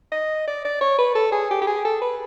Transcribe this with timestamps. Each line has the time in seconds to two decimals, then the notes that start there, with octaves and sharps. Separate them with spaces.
0.12 D#5
0.47 D5
0.65 D5
0.81 C#5
0.98 B4
1.15 A4
1.32 G#4
1.51 G4
1.62 G4
1.67 G#4
1.85 A4
2.02 B4